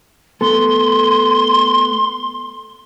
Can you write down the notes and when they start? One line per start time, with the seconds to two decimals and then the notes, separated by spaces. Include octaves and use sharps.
0.41 A3 B3 A4 C6